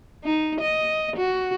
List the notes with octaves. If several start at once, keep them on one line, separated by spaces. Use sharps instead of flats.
D#4
D#5
F#4